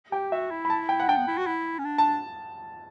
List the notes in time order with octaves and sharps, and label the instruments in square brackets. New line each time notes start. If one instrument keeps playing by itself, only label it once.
[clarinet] G4 [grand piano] G5
[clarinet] F#4 [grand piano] E5
[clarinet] E4
[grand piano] B5
A5
G5
F#5
[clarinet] D4 [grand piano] G5
[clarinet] B3
E4
F#4
E4
C#4
D4
[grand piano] A5